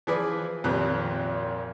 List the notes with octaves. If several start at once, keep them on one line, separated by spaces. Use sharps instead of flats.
E3 F3 E4 G#4 B4 D5
G#1 F2 A#2 F3 G4 F#6